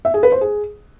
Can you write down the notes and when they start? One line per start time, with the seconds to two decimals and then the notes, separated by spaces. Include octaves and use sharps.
0.05 E5
0.14 G#4
0.23 B4
0.32 C5
0.41 G#4